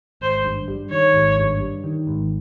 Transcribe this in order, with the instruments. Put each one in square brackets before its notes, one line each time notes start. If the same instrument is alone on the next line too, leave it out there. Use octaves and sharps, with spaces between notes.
[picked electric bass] G#1 [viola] C5
[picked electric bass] G2
G3
[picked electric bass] D#3 [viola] C#5
[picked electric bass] G#1
G2
G3
D#3
G#1